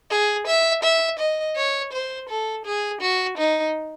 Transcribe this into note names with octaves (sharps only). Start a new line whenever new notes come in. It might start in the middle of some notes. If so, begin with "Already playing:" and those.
G#4
E5
E5
D#5
C#5
C5
A4
G#4
F#4
D#4